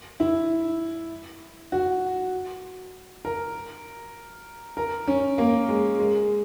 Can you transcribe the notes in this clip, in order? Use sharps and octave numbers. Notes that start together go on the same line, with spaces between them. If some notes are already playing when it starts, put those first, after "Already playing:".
E4
F#4
A#4
A#4
C#4
A#3
G#3
G#3